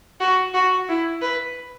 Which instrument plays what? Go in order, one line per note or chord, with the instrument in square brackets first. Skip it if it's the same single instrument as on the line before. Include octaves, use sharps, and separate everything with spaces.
[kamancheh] F#4
F#4
E4
B4